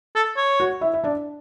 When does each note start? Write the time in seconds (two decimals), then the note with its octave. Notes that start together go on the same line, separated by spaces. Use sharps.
0.15 A4
0.37 C#5
0.60 F#4 F#5
0.81 E4 E5
0.94 E5
1.04 D4 D5